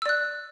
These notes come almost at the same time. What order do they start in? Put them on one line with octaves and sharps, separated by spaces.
E6 D5 F#6